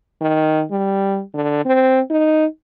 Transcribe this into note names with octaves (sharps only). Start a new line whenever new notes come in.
D#3
G3
D3
C4
D#4